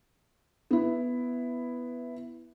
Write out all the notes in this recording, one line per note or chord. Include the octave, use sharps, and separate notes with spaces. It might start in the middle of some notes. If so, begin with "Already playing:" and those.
B3 E4